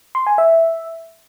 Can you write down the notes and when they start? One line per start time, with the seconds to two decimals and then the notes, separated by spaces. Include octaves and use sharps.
0.15 C6
0.27 G#5
0.38 E5